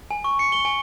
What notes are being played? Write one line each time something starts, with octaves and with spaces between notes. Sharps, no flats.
G#5
C#6
C#7
G7
G#5